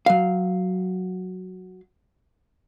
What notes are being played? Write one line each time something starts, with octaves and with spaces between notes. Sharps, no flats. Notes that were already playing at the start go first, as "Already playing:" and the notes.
F#3 F5